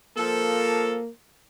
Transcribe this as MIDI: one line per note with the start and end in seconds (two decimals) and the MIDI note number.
0.17 0.99 53
0.17 1.09 58
0.17 0.99 69